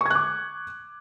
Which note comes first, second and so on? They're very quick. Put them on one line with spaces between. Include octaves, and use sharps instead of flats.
C#6 G#6 F#6 D6